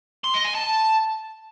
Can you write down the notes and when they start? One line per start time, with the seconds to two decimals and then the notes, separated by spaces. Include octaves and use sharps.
0.24 C6
0.35 D#5
0.45 G#5
0.55 A5